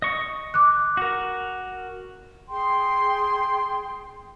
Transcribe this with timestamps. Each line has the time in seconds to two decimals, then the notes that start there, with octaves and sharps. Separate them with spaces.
0.02 D#5 C#6
0.54 D6 F#6
0.97 F#4 A#4
2.48 G#4 G5 C6